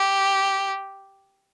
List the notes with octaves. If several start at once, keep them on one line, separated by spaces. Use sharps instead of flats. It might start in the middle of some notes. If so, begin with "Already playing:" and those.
Already playing: G4